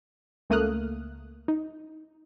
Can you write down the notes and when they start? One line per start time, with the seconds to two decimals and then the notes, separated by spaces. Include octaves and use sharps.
0.50 C#2 A3 A#3 D#6 F6 F#6
1.48 D#4